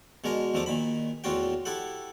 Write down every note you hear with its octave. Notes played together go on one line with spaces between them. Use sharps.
B2 G#3 D4 A#4
E2 F3 A3 D4 D6
A#2 D#3 B5
E2 A2 D4 F4 F#4 G5
E4 G4 A4 F#5